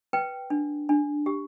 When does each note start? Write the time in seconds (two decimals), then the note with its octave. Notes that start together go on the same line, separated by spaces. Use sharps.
0.13 B4 G5
0.50 D4
0.89 D4
1.26 G4